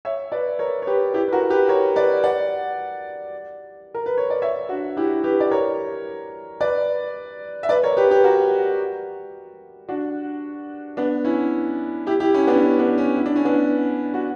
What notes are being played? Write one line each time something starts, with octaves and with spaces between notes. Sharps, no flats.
C#5 E5
B4 D5
A#4 C#5
C#5
G4 B4
E4 G4
B4
F#4 A#4
G4 B4
A#4 C#5
B4 D5
D5 F#5
A#4
B4
C#5
D5
C#5 E5
D4 F#4
E4 G4
G4 B4
D5
A#4 C#5
B4 D5
E5
B4 D5
A#4 C#5
G4 B4
G4 B4
F#4 A#4
D4 F#4
B3 D4
C#4 E4
E4 G4
E4 G4
C#4 E4
B3 D4
C#4
B3 D4
C#4
E4
D4
C#4
B3 D4
F#4